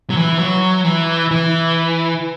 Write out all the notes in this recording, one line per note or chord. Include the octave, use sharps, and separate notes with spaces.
F#3
E3
F#3
E3
E3